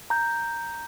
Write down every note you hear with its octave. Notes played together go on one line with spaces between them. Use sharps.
A#5 G6